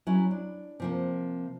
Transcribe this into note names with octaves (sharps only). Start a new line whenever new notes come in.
F#3 C#4 E4
D4
C3 F3 A#3